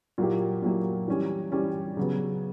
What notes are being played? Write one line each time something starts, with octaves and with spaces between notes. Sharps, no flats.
A#2 F#3 A#3 E4 G4
A#2 F#3 A#3 E4 G4
E3 G3 C#4 G4
E3 G3 C#4 G4
C#3 F#3 B3